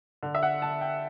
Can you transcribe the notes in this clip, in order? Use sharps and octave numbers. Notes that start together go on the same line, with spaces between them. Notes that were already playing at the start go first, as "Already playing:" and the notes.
D3
E5
F#5
D3 A5
G5